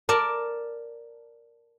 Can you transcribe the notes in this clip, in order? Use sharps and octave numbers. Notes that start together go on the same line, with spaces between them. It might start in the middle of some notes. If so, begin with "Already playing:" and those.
A#4 D5 A5